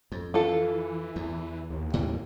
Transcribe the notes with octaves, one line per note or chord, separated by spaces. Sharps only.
F2
E3 F4 A4
E2
D#2
A2 E3 G3